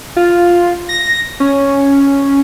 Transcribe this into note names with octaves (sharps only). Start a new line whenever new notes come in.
F4
A#6
C#4